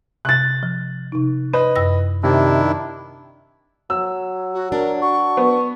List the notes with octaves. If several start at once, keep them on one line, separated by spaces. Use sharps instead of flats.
C3 F#6 A6
F3
C3 D#4
B4 D#5
F#2 E6 A#6
C3 D#3 D4 E4
F#3 E6
F#4
D4 A#4
F#4 C#6
B3